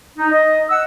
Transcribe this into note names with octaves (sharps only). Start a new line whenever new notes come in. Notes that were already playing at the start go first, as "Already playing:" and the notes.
D#4
D#5
F#5 E6